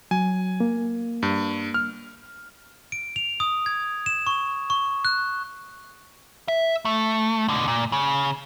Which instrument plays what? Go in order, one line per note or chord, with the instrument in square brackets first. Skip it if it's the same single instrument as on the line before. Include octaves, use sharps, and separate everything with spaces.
[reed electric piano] F#3 [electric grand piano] G#5
[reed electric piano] A#3
[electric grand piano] G2
F6
[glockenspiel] D7
F7
D#6
G#6
E7
C#6
C#6
F#6
[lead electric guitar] E5
A3
B2 D3
A#2
C#3